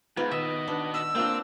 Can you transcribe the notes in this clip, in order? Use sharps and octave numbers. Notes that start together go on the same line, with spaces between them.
G#2 B3 E4 F4
D#3 F#4 D#5 E5
B3 D4
E6
A#3 C4 D4 E4 F4 G5